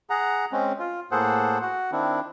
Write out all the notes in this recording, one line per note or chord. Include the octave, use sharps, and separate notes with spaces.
G#4 F#5 A#5
G#3 C4 C#4
F4
A2 A#3 G#4 A4 C5 F#5
F#4 F#5
D#3 C4 D4 E4